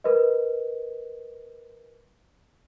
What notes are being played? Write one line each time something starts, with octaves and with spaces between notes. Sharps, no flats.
A#4 B4 D#5